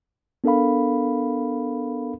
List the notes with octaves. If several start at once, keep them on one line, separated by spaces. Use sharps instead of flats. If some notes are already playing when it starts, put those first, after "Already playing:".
B3 D4 A4 A#4 F5 B5